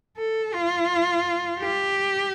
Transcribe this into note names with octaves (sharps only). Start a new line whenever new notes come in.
A4
F4
G4